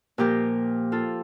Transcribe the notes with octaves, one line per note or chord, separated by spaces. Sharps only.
A#2 F3 G4 A#4
F4 A4